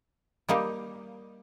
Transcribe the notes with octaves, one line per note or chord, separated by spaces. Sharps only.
G3 A#3 D#4 G4